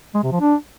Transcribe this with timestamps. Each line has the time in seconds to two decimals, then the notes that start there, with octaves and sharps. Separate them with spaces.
0.14 G#3
0.23 C3
0.32 F3
0.40 D4